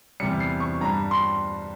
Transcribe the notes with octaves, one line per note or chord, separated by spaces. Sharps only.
E2 C3 G3 C#7
C7
C#6
G2 G3 A#5
C6